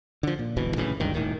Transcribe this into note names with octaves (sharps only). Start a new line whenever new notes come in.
D3 F3
A#2
D1 G1 B2 E3
A#1 A2 C#3 E3
F#1 C#2 G2 D#3
D#1 A2 D#3